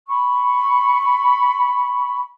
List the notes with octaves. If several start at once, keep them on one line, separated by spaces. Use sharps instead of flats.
B5 C#6